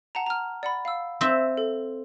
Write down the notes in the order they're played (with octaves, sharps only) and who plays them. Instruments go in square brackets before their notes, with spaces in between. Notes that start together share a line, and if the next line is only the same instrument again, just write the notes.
[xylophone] F#5 A5 A#5
A#5 F6
D5 F#5 B5
F5 E6
[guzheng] C4 E5
[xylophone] A4